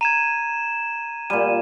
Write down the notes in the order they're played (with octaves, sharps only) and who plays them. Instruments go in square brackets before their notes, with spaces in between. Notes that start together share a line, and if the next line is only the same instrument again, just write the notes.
[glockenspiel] A#5 G#6 [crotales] D#7 E7
[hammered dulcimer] A#2 G3 [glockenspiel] D#7